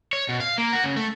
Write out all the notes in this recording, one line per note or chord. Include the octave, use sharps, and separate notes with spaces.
C#5
B2
F5
A#3
F#4
C#3
A3